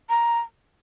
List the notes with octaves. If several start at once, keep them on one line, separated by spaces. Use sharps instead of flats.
A#5